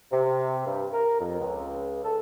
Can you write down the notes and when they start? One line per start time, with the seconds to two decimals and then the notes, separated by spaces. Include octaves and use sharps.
0.11 C3
0.65 G2
0.92 A#4
1.20 F2
1.39 C#2
2.03 A4